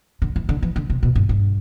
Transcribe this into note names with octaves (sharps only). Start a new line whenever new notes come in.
D3
E3
D3
E3
D3
C3
B2
G2
G2